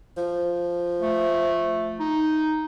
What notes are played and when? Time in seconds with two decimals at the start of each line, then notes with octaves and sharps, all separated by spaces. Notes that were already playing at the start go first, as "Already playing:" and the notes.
0.17 F3
1.01 A3
2.00 D#4